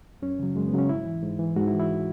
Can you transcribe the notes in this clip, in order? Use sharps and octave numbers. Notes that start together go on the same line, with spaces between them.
F#2 C#4
C#3 F#3
F#2 G#3
B3
C#3 F#3 C#4
G#2 E4
E3
G#2
E3
G#2 F#4
E4
E3
E4